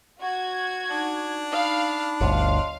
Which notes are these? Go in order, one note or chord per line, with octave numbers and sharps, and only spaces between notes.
F#4 G#6
D4 D#4
D#4 F5 B5
G1 D2 C#5 D#5 F5 C6